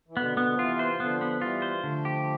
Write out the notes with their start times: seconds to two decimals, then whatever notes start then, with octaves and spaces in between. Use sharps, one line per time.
0.08 E3
0.17 B2 D3 B3
0.37 B3
0.50 F3
0.59 C3 E3 F4
0.79 C5
1.00 D3 F3 B3
1.21 B3
1.41 E3 G3 F4
1.62 C5
1.84 D3 F3 A3
2.05 G4